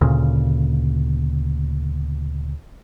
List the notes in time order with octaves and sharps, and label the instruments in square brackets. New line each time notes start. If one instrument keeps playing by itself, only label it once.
[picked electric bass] D2 A#2 C#3